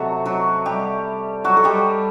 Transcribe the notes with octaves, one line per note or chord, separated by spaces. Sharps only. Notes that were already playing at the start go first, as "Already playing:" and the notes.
Already playing: C3 F#3 A3 F#4
F#3 F#4
G3 G4
F#3 F#4
A4
G3 G4